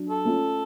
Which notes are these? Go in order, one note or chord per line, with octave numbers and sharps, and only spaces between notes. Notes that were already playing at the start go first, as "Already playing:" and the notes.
Already playing: F#3 D4
A4
A3 C#4 F4